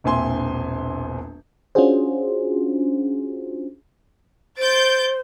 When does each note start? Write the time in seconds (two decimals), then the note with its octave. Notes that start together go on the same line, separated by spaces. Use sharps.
0.04 E1 A#1 C4 E5 G#5 C6
1.75 C#4 D4 F4 F#4 G#4 C5
4.58 C5 G6 A6 D7